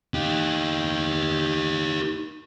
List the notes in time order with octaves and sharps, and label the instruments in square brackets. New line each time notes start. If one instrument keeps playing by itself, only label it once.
[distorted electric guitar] D#4 G4